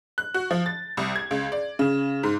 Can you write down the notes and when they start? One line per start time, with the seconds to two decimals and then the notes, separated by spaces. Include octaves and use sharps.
0.18 F#6
0.34 F#4
0.51 F3
0.66 A6
0.97 C2
1.16 G#6
1.31 C#2
1.52 D5
1.79 C#3
2.23 G#2